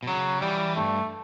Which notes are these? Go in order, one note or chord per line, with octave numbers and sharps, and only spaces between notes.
B2
C#3 F#3
E3 G3
G2 A3